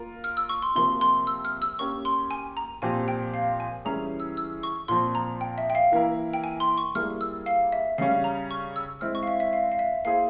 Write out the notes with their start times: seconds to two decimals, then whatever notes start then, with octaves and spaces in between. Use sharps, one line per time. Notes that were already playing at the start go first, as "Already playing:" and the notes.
Already playing: A#3 F4 A#4
0.24 F6
0.37 E6
0.49 C#6
0.62 C6
0.75 C3 F3 A#3 C6
1.01 C6
1.27 E6
1.45 F6
1.62 E6
1.79 A#3 C#4 G4 C#6
2.05 C6
2.31 G#5
2.57 A#5
2.82 A#2 F3 C4 G4 C5 G#5
3.08 G5
3.34 F5
3.60 G#5
3.85 E3 G3 C#4 E4 G#4 A#5
4.20 E6
4.37 E6
4.63 C#6
4.88 A#2 F3 C4 C6
5.15 A#5
5.41 G5
5.58 E5
5.70 G5
5.75 F5
5.92 E3 A#3 E4 A#4
6.34 G5
6.44 G#5
6.60 C6
6.78 C#6
6.95 G3 A#3 E4 G#4 F6
7.21 E6
7.46 F5
7.72 E5
7.98 C#3 G3 C#4 F5
8.24 A#5
8.51 C#6
8.76 E6
9.01 G#3 C4 E4 F6
9.15 C#6
9.23 F5
9.27 E5
9.40 E5
9.53 F5
9.72 F5
9.79 E5
10.05 A#3 E4 G#4 C5 F5